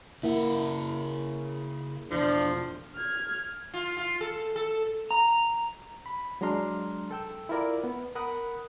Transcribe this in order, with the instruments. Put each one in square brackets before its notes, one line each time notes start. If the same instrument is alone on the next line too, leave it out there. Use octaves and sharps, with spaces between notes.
[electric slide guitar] C#3 F#5 [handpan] A#3 E4
[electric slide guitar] E2 B2 [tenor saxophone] F3 [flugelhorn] D4
[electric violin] F6 G#6
[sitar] F4
F4
A4
A4
[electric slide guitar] A#5
[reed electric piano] B5
F#3 G#3 D4 A#5 C6 F6
A4 G5 E6
E4 F4 A#4 D5
B3
A#4 F#5 B5 D#6 F#6